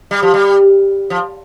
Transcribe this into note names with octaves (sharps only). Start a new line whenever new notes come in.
G3
F3
G3
F3